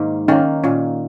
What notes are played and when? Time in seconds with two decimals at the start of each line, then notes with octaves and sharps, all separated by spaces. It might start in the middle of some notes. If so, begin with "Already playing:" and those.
Already playing: G#2 D#3 A#3
0.28 D#3 A#3 C#4
0.64 A#2 C#4